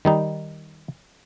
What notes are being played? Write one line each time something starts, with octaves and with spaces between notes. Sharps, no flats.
D#3 G3 D#4